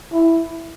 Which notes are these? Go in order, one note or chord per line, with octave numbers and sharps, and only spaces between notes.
E4